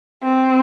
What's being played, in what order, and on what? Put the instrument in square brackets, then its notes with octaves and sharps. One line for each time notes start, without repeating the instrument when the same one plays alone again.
[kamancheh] C4